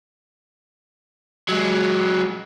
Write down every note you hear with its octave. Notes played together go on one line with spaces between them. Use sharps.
F#3 G#3